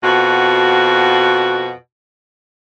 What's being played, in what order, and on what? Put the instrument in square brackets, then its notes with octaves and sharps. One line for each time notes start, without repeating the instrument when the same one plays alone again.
[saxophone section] F2 B2 F#4